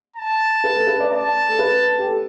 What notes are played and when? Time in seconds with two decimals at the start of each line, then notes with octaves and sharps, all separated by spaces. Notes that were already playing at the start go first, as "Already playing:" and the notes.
0.16 A5
0.64 B4
0.76 A4
0.87 B4
1.00 D5
1.11 D5 A5
1.49 A4
1.59 B4
1.99 G4
2.06 A4